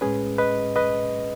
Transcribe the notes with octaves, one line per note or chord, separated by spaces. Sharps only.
A2 G#3 C#4 G#4 B4
B4 D#5
B4 D#5